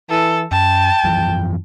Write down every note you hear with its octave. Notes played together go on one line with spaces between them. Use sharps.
E3 A4
F#2 G5 A5
F#2 E3 F3